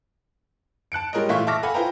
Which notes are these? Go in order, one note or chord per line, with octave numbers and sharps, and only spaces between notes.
A5 F#6 C#7 D7
G3 G#3 A#4 C#5 D#5
A#2 E3 A3 E5 F5 C#6
E5 A5 C#6 D6 F6 A#6
A4 F5 F#5 G#5 B5
E4 F4 B4 C5 G5 A#5